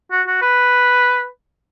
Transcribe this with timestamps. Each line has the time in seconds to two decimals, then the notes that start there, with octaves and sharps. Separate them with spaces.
0.12 F#4
0.27 F#4
0.42 B4